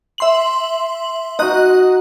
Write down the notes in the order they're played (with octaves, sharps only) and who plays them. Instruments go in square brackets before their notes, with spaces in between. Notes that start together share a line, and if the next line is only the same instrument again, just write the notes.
[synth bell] E5 C6 F#7
[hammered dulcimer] D#4 F#4 [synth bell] D#5 F#6